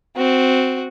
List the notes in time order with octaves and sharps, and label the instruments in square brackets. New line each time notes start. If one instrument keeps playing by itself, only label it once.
[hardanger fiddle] C4 F#4